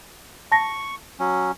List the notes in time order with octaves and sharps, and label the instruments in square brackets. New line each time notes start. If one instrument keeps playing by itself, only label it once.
[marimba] A5 A#6 [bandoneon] C#6
[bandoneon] F#3 C#4